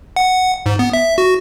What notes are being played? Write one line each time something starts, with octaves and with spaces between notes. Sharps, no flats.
F#5
G#2
B3
E5
F#4